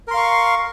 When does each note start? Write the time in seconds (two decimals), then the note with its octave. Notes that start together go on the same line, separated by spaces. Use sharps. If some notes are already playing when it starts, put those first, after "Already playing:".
0.08 A#4
0.11 C6
0.14 F5
0.17 C#6